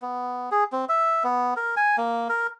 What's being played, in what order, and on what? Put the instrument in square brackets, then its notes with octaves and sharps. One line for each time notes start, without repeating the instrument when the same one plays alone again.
[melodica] B3
G#4
C4
E5
B3
A#4
G#5
A#3
A#4